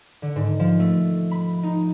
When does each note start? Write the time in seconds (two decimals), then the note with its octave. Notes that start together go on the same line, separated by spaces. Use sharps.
0.22 D3
0.36 G#2
0.60 F3
0.79 A3
1.31 B5
1.63 D#4